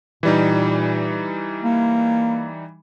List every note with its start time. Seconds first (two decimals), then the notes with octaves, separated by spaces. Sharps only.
0.23 A#2 E3 G3 D#4
1.63 A#3